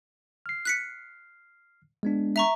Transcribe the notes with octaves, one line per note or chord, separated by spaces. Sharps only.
F6 C7
F#6 B6 C#7
G#3 B3 D4
E5 A#5 C#6